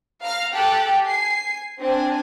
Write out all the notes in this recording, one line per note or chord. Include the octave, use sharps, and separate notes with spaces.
F5 A#5 F6
G4 A4 G5 A5 F#6
G#5 C7
C4 D4 G#5